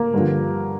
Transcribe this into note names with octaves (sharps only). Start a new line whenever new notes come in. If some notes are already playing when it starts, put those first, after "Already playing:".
Already playing: A#3 A#4
G2 D3 F3